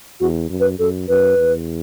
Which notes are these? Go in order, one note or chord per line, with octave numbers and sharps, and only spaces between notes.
E2 F#4
F#2
B4
F#2 A4
F#2 B4
E2